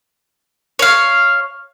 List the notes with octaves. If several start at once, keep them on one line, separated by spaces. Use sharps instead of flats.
C#5 F5